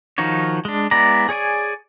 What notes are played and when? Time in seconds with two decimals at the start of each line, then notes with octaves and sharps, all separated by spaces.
0.18 D#3 F3 D#4 F#4 C#5
0.65 G#3 D4
0.91 G#3 B3 E4 D5 A#5
1.29 G#4 C#5 D5 G#5